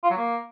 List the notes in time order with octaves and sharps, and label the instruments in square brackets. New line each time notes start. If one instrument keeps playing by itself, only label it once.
[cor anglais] F4
F#3
A#3